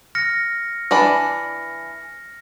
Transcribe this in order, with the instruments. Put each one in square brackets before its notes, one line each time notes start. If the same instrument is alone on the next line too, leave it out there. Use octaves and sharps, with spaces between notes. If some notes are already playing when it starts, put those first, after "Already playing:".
[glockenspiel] F6 A#6 C#7
[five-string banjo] E3 D4 B5 [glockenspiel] A#6